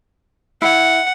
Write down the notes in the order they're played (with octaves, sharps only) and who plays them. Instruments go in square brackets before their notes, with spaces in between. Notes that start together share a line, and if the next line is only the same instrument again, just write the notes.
[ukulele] E4 [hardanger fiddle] F#5